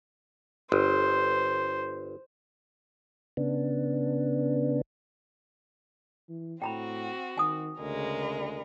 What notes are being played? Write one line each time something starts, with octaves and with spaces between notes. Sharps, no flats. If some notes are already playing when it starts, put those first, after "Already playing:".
G1 C5
C#3 B3 D4
E3
A2 C4 F#4 G5 A#5 B5
D#3 G#5 D#6
D2 C#3 G#3 A#4